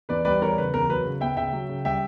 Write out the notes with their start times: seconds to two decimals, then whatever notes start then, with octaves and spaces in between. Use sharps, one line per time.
0.09 E2 B4 D5
0.25 G3 B4 D5
0.41 E2 A#4 C#5
0.58 C#3 B4
0.74 E2 A#4
0.89 F#3 B4
1.05 C#3
1.21 B3 E5 G5
1.37 C#3 E5 G5
1.53 F#3
1.69 C#3
1.85 G3 E5 G5